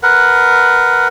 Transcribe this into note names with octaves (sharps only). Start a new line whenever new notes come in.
A#4 B4 F#5